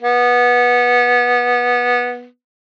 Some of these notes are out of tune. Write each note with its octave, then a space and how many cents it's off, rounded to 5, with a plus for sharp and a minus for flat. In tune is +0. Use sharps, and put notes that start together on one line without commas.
B3 -15